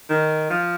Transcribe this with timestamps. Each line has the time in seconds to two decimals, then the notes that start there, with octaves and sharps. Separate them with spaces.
0.09 D#3
0.50 F3